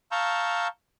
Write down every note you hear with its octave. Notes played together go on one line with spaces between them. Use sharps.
F5 A5 A#5 C#6 E6 G6